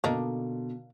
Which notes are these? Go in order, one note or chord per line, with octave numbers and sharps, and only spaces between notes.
B2 D3 A#3 D4 D#4